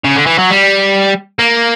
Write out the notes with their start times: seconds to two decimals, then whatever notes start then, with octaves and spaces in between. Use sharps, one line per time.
0.04 C#3
0.16 D3
0.26 E3
0.38 F#3
0.50 G3
1.39 A#3